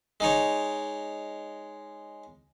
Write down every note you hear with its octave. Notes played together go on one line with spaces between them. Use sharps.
G#3 D#4 C#5